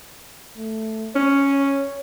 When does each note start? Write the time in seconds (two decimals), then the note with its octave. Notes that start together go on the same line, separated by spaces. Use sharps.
0.57 A3
1.15 C#4 C#5